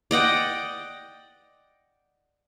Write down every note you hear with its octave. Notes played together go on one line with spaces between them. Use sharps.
D5 D#5 F#5 G5